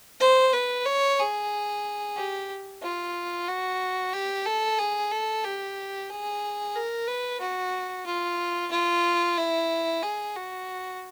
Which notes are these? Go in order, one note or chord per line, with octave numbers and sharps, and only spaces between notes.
C5
B4
C#5
G#4
G4
F4
F#4
G4
A4
G#4
A4
G4
G#4
A#4
B4
F#4
F4
F4
E4
G#4
F#4